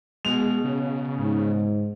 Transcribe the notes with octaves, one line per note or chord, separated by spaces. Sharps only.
B2 G#3 F7
C#3
G#2